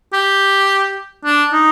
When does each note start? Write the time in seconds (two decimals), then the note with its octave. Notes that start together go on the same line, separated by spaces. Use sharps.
0.13 G4
1.25 D4
1.53 D#4